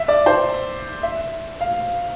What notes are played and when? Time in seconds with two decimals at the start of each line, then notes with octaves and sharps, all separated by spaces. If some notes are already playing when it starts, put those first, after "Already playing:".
Already playing: E5
0.08 D5
0.26 C5
1.03 E5
1.60 F5